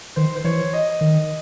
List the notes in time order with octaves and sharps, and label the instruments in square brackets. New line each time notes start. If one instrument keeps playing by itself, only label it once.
[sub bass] D#3 [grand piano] C5
[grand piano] C5
[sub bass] E3 [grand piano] C#5
[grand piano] D#5
[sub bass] D#3